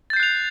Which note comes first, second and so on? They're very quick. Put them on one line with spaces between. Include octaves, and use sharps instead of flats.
A6 G6 C7 F#6 F7